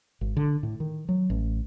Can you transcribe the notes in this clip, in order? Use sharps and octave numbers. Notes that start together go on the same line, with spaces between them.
G#1
D3
A2
D#3
F#3
A1